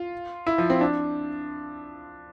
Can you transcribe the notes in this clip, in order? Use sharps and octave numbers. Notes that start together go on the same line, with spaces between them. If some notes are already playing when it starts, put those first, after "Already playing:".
Already playing: F4
E4
F3
C4
D4